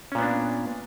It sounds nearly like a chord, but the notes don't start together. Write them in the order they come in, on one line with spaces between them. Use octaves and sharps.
C#4 A#2 B3 D4